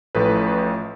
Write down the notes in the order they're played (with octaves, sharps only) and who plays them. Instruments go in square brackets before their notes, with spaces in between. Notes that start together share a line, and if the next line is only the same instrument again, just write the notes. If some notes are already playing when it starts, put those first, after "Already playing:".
[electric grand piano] A1 A2 F3 A3 B4